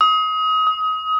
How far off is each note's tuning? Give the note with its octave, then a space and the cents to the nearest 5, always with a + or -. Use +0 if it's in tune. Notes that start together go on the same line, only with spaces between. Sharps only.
D#6 +30
D#6 +25